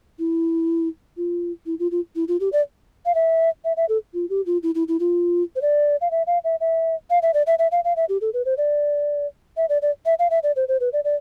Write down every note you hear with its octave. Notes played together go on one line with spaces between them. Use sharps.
E4
F4
E4
F4
F4
E4
F4
G4
D5
F5
E5
E5
E5
A4
F4
G4
F4
E4
E4
E4
F4
C5
D5
F5
E5
F5
E5
E5
F5
E5
D5
E5
E5
F5
F5
E5
G4
A4
B4
C5
D5
E5
D5
D5
E5
F5
E5
D5
C5
C5
B4
D5
D5